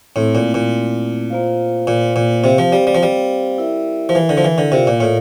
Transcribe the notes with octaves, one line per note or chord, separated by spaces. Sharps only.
A2 A3 C4 E4
A#2
A#2
A#3 F4 C5 F5
A#2
A#2
C3 C4 G4 C5 F5
F3
G3
G3
F3
G3
E4 A#4 E5
F3
E3
D3
F3
E3
D3
C3 F4 A#4 D5 F5
A#2
A2